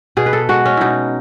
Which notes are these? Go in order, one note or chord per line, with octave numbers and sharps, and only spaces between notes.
B2 G#4
B4
A4
G#3 F#4
C#4
B2 D#4 E4